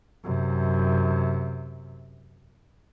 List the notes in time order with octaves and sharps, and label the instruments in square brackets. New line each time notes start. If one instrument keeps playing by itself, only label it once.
[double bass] F#2 C3